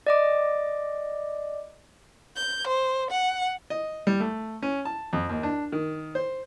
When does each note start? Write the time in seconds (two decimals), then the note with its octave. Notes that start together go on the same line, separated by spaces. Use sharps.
0.07 D5 D#5 D6
2.36 G6
2.67 C5
3.11 F#5
3.70 D#5
4.07 G3
4.20 A3
4.62 C#4
4.85 A5
5.13 F2
5.29 D#2
5.43 D4
5.72 D#3
6.15 C5